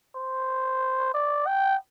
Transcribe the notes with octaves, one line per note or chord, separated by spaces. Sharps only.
C5
D5
G5